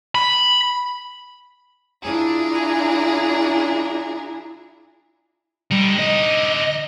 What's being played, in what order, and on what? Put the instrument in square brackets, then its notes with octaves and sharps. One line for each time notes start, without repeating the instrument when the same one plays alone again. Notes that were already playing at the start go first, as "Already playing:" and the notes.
[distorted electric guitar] B5
[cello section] D4 E4 F4 [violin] G#4 A#5
[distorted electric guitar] D3 D#4 [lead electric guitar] G3
[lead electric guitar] D#5